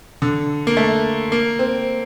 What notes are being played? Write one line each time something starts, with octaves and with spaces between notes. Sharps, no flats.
D3
A#3
A3
A#3
C4